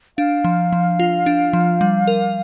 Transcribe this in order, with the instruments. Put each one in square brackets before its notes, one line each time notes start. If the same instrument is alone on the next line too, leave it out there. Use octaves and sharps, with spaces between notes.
[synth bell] D4 [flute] F5
[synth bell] F3
F3
F4
D4
F3
G3
A#4